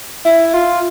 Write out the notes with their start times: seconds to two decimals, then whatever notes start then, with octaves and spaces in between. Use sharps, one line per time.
0.26 E4
0.54 F4